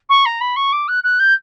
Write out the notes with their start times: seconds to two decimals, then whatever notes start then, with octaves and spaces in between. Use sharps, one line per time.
0.09 C#6
0.25 A#5
0.40 B5
0.56 C#6
0.72 D6
0.88 F#6
1.03 F#6
1.19 G6